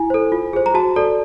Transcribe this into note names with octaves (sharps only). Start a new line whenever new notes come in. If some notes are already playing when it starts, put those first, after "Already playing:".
Already playing: E4 G#5
A4 C5
F4
G#4 C5
A#5
F#4 A5
A4 D5